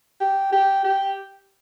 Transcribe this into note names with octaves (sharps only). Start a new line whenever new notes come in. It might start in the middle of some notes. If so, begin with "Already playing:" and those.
G4
G4
G4